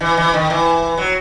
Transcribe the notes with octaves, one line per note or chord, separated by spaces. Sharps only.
E3
E3
D#3
E3
F#3